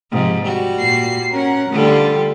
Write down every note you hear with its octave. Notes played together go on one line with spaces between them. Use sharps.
G#2 C3 F3
G3 F#4
A#2 C7
C#4 A#4 F#5
D3 G3 A3 F4 A4